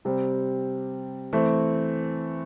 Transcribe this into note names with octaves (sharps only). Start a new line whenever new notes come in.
C3 G3 C4
E3 A3 C4